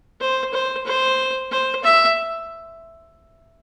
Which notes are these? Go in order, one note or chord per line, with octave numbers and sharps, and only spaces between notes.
C5
C5
C5
C5
E5